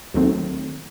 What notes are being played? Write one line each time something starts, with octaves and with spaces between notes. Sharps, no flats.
D#2 D#3 F#3 A3 C4